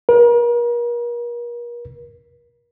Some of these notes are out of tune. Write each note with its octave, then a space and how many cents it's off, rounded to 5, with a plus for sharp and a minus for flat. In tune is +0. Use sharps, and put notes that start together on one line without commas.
A#4 +40